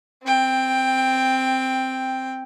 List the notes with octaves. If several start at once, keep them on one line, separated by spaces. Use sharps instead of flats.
C4 G5